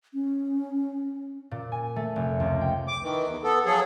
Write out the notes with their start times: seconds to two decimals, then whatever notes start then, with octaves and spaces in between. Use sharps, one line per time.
0.14 C#4
1.51 A#2
1.72 G#5
1.96 A3
2.16 F1
2.40 C#2
2.61 G5
2.88 D6
3.02 D#3 E3
3.26 E2
3.43 B3 A4
3.65 F3 F#3 G#4 A4